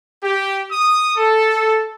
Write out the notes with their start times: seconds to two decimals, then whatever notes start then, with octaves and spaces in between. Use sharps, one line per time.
0.23 G4
0.70 D#6
1.17 A4